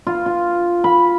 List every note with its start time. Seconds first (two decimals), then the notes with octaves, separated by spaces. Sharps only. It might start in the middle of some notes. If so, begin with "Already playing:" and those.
0.07 F4
0.26 F4
0.84 B5